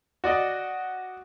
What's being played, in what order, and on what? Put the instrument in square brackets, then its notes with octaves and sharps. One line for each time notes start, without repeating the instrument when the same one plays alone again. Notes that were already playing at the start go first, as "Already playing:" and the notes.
[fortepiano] F#4 D5 D#5